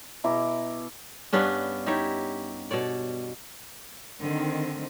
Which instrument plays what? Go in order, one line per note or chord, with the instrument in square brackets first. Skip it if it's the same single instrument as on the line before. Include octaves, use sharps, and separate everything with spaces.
[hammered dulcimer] B2 E4 A#5 D6
[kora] G2 B3 C#4 D4
D#4 E4 G4 C#5
B2 A4 C#5 D5
[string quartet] D3 [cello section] D#3 C4